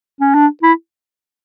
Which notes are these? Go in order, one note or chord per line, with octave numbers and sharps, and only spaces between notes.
C#4
D4
E4